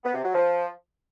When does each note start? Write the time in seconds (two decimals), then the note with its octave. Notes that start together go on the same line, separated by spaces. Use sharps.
0.04 B3
0.14 C3
0.24 F#3
0.34 F3